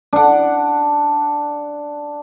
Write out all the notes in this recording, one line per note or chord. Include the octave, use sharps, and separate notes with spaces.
D4 F#5